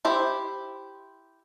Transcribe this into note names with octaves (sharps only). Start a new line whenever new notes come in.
E4 G4 C5